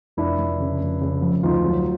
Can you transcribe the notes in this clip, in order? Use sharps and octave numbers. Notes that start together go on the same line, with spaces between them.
F1 D4 E4
F1
C#3
F1
C#3
F2
D2 D#4 F4
F#3